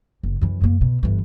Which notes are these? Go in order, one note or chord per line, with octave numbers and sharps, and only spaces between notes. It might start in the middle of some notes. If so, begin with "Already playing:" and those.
F#1
F#2 E3
F#2 A#3
B2
G1 E3